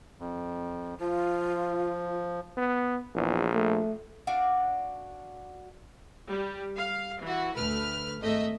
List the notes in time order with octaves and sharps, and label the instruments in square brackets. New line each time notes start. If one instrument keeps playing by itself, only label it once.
[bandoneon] F2
[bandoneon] F3 [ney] F4
[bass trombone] B3
[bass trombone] A#1 [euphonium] E2
[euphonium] A3
[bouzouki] D4 F#4 D5 F5
[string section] G3
F5
E3 F#4
D2 A3 B4 F6
G#1 A3 D#5 E5